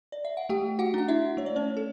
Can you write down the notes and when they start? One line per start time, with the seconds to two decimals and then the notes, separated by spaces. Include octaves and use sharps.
0.12 D5
0.25 E5
0.37 F#5
0.49 A3 G4 G5
0.79 F#4 F#5
0.94 D4 F#5
1.08 E4 E5
1.37 A3 C#5
1.46 D5
1.56 C#4 C#5
1.77 A4